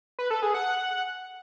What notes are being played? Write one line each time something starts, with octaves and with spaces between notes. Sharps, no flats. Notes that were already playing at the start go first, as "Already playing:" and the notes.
B4
A4
G#4
F#5